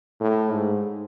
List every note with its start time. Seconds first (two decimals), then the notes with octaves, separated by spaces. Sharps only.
0.20 A2
0.52 G#2